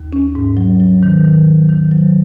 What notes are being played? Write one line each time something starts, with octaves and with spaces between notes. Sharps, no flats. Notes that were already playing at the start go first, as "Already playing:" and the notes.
Already playing: D#2
C#4
G#2
F#3
F#3
D#3
D#3
F#3
D#3
F#3